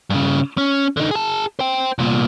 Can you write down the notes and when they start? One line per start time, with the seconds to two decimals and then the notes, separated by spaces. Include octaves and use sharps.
0.10 G2 C#3
0.58 C#4
0.97 D3 D#4
1.11 G#4 A5
1.59 C5 G5
1.99 C2 A#2